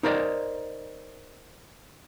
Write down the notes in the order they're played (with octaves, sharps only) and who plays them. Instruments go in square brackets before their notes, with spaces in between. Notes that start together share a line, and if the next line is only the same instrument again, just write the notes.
[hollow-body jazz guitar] D#4 A#4 C5 D5 D#5